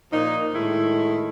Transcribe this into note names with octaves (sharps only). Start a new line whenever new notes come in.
A#2 F3 D#4
A2 D#3 G#3 E4